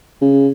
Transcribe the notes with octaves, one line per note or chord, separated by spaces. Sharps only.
C#3